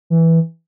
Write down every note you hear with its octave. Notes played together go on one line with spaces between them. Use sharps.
E3